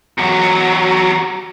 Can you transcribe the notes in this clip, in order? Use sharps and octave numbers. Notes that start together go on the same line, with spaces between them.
E2 F#3